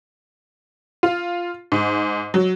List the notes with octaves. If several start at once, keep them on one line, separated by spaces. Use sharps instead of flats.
F4
G#2
F#3